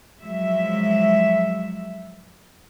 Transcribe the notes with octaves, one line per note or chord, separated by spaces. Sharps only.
F3 F#3 G#3 E5